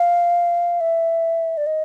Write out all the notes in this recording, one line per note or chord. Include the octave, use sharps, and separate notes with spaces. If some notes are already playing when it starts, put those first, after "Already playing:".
Already playing: F5
E5
D5
D#5